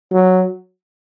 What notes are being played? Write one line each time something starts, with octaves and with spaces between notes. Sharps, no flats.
F#3